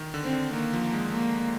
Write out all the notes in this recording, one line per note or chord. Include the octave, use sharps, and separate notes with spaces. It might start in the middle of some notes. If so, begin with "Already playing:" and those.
Already playing: D#3
D3
C4
D3
D#3 A#3
F3
G#3
A#3